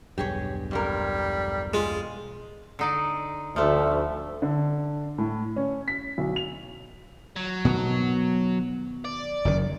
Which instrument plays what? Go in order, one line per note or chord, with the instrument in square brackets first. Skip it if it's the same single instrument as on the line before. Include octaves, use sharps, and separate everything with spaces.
[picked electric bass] E1 B1 G2 [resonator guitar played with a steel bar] G4 G#4 C#5
[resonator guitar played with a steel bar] F2 A2 A#4 [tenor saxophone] G3
[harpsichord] G#3 F4
[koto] D3 D#4 D5
[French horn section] D2 [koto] F3 A3 [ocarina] E5
[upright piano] D3
A2
C#4
B6
B1
F7
[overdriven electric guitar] F#3
[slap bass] B2 D#3 B3
[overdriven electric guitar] D5
[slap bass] F#1 F#2 D#3